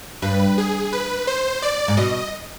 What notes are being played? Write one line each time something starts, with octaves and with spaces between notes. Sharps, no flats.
G2 B4
G#4
B4
C5
D5
G#2
B2 D#5